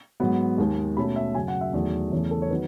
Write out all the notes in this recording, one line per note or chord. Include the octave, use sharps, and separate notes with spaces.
G#2 F#3 B3
D#2 D#3 G#3
B2 A3 C#4 B5
E5
F#2 C#3 F#3 G#5
F#5
E5
E2 D#3 F#3 A3
E2 C#3 E3 A3 C#5
A4
C#5
D#3 F#3 B3 B4